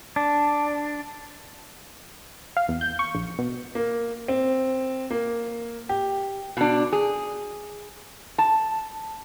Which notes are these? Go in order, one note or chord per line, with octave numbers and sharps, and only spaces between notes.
D4
F5
E2
G6
C#6
A#1
B2
A#3
C4
A#3
G4
B2 D4
G#4
A5